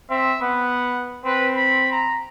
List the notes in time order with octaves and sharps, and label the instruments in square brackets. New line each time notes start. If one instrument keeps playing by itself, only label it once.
[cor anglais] C4 [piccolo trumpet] E5
[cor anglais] B3 [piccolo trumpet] F#5
[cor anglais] C4 [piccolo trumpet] B4
[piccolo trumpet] B5
A#5